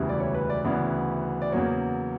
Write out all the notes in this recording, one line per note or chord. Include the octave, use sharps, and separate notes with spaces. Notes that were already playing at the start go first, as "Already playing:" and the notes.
Already playing: E1 D2 C#3 E3 G3
D5
C#5
B4
D5
D2 C#3 E3 B3 D5
D5
E2 C#3 F#3 A#3 C#5